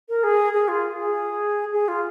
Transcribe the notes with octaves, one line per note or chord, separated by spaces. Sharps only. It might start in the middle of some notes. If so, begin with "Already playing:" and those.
A#4
G#4
G#4
F4
G#4
G#4
F4